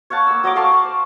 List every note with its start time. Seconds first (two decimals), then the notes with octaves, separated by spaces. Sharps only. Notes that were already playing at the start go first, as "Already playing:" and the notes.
0.10 C#5 F5 F#5 A5
0.27 A#3 E6
0.43 F#3 D#5 A#5 D6
0.56 A4 F5 A5 C#6
0.72 D5
0.84 C5